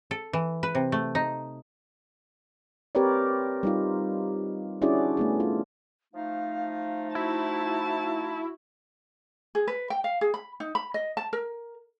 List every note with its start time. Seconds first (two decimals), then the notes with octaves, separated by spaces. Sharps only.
0.11 A4
0.33 E3
0.63 B4
0.75 C3
0.92 A3
1.15 D#4
2.95 C4 G4 A#4 B4 C#5 D5
3.63 G3 D#4 F4
4.82 C#4 D4 E4 F#4 G#4 D5
5.17 A3 B3 G#4
5.40 F4
6.14 F3 A3 D#4 F5
7.15 E4 F#4 A5
9.55 G#4
9.68 B4
9.90 G5
10.04 F5
10.21 G#4
10.34 B5
10.60 D#4
10.75 B5
10.94 D#5
11.17 A5
11.33 A#4